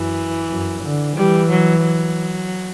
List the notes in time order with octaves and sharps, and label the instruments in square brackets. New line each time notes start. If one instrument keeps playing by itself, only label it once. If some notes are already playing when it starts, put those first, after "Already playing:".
Already playing: [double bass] F#2 [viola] E3
[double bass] F#2
D3
[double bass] E3 [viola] G3
[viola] F#3
F#3